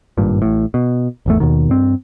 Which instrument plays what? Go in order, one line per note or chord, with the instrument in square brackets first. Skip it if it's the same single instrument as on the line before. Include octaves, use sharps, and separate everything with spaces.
[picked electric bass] G#1 G2 A#2
A1 A2
B2
G#1 E2 A3
D#2 B2 D#3
G2 C4